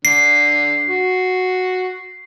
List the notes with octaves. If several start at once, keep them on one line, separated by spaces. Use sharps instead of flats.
D3 C7
F#4